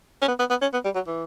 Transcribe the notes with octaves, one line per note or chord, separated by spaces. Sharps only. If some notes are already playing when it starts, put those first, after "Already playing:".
C#4
B3
B3
B3
C#4
B3
G3
F#3
E3